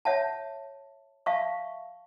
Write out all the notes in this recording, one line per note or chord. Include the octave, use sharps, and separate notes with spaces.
C#5 E5 F#5 A5
E5 F5 A5 C#6